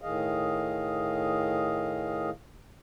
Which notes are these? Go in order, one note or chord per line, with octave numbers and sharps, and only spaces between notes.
A2 D#3 G#4 D#5 F5